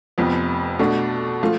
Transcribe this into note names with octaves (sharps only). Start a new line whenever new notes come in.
F1 F2 F3 B3
B2 A3 D4
F3 A3 F4